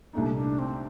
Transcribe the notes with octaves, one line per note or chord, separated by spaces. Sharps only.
C2 A#2 A3 D4 D#4
D4
C4